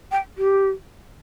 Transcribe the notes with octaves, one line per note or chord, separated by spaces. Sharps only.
G5
G4